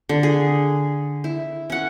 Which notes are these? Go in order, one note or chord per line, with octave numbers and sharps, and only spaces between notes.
D3
G#4
E4
C#4 F#5